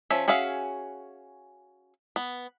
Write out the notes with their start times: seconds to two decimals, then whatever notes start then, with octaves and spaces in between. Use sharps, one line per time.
0.10 F3 C#4 E5
0.28 C#4 F#4 G#4 E5 F5
2.16 B3